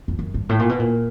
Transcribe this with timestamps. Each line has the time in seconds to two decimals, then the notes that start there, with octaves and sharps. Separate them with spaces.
0.08 F2
0.19 F#2
0.34 G2
0.49 A2
0.59 A#2
0.69 B2
0.79 A#2